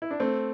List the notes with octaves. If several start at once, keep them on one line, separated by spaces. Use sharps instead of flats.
E4
D4
A3 C4